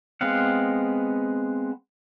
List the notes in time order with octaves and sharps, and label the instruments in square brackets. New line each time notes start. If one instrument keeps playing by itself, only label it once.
[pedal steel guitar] G#3 B3 C4 F5 F#5